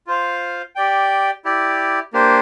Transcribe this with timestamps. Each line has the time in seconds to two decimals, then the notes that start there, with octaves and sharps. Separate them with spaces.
0.07 F4 C5 F5
0.75 G4 D5 G5
1.45 E4 G4 D5
2.13 A#3 D4 G4 C5